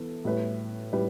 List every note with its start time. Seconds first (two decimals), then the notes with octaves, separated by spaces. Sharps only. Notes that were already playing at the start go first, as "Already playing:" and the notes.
Already playing: E3 B3 A4
0.25 A2 G3 E4 B4
0.93 A2 G3 E4 B4